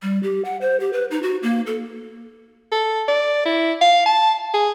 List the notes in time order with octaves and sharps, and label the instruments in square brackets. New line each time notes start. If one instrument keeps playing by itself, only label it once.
[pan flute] G3
G4
F#5
C5
G4
B4
D#4
F#4
A#3
A4
[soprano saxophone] A4
D5
E4
F5
A5
G#4